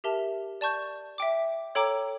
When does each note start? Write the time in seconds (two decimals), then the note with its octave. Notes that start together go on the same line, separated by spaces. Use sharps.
0.04 G4 A#4 E5 A5
0.61 D5 A5 C#6 G6
1.18 E5 G5 D6
1.75 A4 C#5 G5 A#5 D6